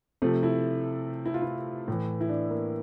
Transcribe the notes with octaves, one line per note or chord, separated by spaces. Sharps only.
C3 F3 A3
E4
E4
F4
E4
A2 E3
E4
D4
A#3